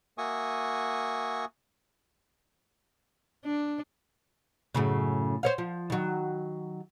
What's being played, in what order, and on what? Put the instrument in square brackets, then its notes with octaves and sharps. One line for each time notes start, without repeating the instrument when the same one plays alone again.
[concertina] A#3 F#4 E5 G#5 C#6 D#6
[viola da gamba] D4
[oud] F#2 A2 C#3
C5 C#5 F5
F3
D#3 F#3